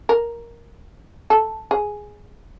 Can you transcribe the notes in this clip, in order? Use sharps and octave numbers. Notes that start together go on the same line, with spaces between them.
A#4
A4
G#4